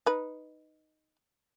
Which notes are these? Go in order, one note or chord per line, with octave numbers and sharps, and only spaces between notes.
D#4 B4